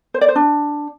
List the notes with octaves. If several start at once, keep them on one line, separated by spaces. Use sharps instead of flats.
C5
D5
C5
D4